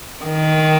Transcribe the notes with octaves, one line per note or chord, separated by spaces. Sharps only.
D#3